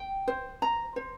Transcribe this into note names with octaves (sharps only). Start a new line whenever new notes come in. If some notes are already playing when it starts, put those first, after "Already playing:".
Already playing: G5
C5
A#5
C5